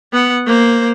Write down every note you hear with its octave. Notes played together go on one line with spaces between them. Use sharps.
B3 F#5
A#3 C5